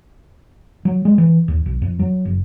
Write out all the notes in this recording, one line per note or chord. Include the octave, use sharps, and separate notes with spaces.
F#3
G#3
E3
D#2
B1
F2
F#3
F#1